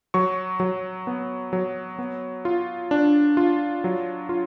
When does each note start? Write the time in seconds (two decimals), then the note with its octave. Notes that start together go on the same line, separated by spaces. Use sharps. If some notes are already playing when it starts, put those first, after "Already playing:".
0.14 F#3 C#6
0.60 F#3
1.07 B3
1.53 F#3
1.99 B3
2.45 F4
2.91 D4
3.37 F4
3.84 F#3
4.29 F4